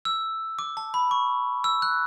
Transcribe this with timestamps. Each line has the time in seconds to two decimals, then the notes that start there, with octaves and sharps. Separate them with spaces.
0.05 E6
0.59 D6
0.77 A5
0.94 B5
1.11 C#6
1.64 E6
1.82 F#6